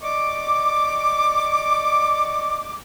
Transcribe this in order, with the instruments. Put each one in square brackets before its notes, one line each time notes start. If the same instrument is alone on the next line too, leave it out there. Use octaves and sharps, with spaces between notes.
[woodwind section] D5 D#5 C#6 D6